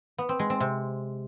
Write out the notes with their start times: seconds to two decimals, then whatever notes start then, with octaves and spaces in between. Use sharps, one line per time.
0.18 B3
0.29 C4
0.39 G#3
0.50 C4
0.60 C3